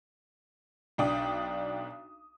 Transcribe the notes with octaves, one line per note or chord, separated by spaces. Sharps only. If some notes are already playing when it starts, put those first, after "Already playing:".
B1 D4 G5 D#6